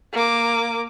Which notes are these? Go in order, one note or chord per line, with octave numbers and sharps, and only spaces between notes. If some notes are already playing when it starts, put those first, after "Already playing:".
A#3 D6